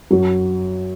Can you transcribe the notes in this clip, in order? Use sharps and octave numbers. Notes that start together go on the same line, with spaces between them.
F#2 F#3